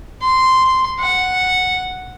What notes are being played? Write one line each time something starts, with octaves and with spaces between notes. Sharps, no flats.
C6
F#5